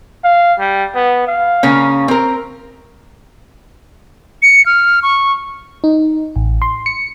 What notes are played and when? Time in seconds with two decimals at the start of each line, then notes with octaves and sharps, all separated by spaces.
0.24 F5
0.60 G3
0.95 B3
1.27 F5
1.63 C#3 A#3 C#4
2.08 C4 A#4
4.42 C#7
4.66 F6
5.03 C#6
5.84 D#4
6.36 A1
6.62 C6
6.86 C#7